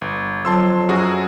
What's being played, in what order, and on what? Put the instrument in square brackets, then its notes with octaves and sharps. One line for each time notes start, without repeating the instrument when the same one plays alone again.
[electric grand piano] G1
[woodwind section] F2 F#3 [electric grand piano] A5 C6 E6
[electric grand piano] F#2 F#4 G#4